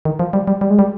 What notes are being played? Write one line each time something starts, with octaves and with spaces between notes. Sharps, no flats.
D#3
F3
G3
G3
G3
G#3
G3